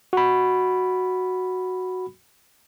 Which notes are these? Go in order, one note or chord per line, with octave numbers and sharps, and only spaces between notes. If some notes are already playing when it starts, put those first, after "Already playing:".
F#4 B5